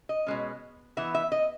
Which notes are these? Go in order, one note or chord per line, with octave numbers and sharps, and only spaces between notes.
D#5
B2 G#3 C#4
E3 B3 E5
E5
D#5